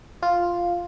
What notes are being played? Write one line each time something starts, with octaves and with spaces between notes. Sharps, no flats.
F4